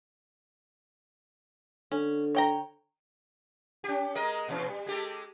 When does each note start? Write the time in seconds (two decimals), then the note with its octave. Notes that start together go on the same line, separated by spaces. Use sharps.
1.92 D3 C#4
2.35 C#5 G5 A#5
3.84 C#4 G4
4.15 G#3 A#4 D#5
4.48 A#2 E3 C#4
4.68 G3
4.86 G#3 G4 A4